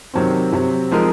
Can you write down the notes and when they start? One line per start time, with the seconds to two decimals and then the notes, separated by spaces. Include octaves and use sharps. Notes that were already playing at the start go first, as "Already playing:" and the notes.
0.14 C3 D#3 F#3 C4
0.52 C3 F#3 C4
0.91 F3 G#3 C4 D#4 A#4